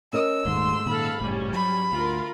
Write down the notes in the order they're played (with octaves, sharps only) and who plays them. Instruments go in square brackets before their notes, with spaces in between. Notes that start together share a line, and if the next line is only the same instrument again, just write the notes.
[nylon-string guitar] C#4 A#4 D#5 [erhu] E6
[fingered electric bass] D#1 D#3 [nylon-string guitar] G#2 [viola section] A3 C6
[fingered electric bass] A#2 D#3 [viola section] A4 F5 B5
[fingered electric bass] F#1 A2 [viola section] G3 C#4
[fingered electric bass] F#3 [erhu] B5
[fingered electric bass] D2 [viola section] F4 A#4